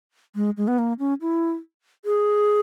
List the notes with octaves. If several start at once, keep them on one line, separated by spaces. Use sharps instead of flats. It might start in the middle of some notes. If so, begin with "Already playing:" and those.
G#3
G#3
B3
A#3
C#4
E4
G#4